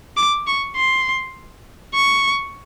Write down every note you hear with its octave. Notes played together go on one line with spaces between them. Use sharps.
D6
C#6
C6
C#6